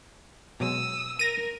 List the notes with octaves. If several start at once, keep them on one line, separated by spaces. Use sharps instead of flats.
B2 F#3 G#3 D#6 E6
A#4 A#6 D#7